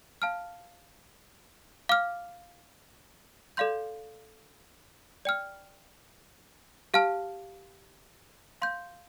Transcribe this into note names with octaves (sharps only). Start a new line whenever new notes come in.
F5 A5 F6
F5 D6 F6
A4 D5 F5 C6 G6
D5 G5 F6
G4 F5 A5 F6
F5 C6 G6